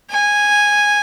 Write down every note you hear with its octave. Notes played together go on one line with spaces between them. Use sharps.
G#5